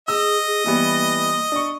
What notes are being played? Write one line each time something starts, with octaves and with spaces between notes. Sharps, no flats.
G#4 D#5 E6
G#4
E3 G3 A#3 B3
D4 C#6